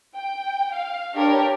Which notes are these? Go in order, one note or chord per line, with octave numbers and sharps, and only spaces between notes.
G5
F5
D4 G4 A#4 B4 C#5 G5